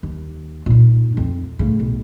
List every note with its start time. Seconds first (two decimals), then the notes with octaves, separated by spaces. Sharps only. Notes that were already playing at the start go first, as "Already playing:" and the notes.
0.03 D#2
0.66 A#2 D#4
1.17 F2 C4
1.59 A2 C#3
1.79 B1